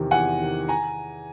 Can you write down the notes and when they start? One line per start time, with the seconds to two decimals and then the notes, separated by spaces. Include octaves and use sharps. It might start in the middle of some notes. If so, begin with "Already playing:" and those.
Already playing: E2 C3 D#3
0.11 E2 F#5 G#5
0.40 C3 D#3
0.69 G#5 A#5